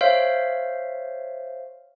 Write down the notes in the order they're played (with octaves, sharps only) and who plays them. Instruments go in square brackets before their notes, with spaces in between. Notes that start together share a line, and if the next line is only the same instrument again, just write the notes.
[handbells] C5 C#5 E5 F5